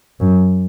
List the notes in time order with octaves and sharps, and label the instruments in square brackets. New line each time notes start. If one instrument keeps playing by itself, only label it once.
[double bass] F#2